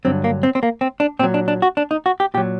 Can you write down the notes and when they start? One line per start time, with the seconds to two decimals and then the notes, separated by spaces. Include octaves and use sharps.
0.05 G2 D3 F#3 C4
0.24 A#3
0.43 C4
0.55 C4
0.63 A#3
0.81 C4
1.00 D4
1.19 A#2 C4
1.23 F#3
1.34 D4
1.48 D4
1.62 F#4
1.77 D4
1.91 D#4
2.06 F#4
2.20 G4
2.34 A#2 G4
2.37 F#3